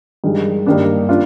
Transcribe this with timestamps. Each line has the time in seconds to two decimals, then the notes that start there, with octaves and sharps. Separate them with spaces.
0.24 G2 D#3 G#3
0.66 G2 D#3 A#3 D4
1.09 D4 F4